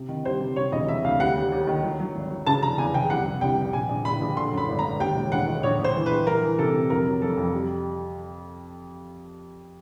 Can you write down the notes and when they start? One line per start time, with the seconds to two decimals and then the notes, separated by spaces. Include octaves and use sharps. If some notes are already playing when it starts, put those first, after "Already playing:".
Already playing: C3
0.09 D#3
0.25 G3 C5
0.40 C3
0.56 C3 C#5
0.72 E1 D#5
0.88 C3 E5
1.05 D2 F5
1.20 G3 F#5
1.36 D#2
1.52 D#2
1.67 D#3
1.83 F#3
2.00 F#3
2.15 G#1
2.31 F#3
2.46 C#3 A5
2.62 F1 A#5
2.78 E2 G#5
2.94 F1 G5
3.10 C2 F#5
3.26 C3
3.41 C2 G5
3.58 C3
3.73 A#1 G#5
3.89 A#1
4.05 A#1 B5
4.21 A#1
4.37 D3 C6
4.52 F#2
4.58 B5
4.69 G#1
4.79 A#5
4.84 G#1
5.00 D#2 G5
5.16 E1
5.32 E1 F#5
5.47 D#3
5.63 A#1 C#5
5.79 A#1
5.84 C5
5.95 E3
6.06 B4
6.11 A#1
6.26 E3 A#4
6.43 E3
6.59 C3 A4
6.74 C3
6.90 F2 A#4
7.06 F#3
7.22 F2 A4
7.37 F2
7.53 G3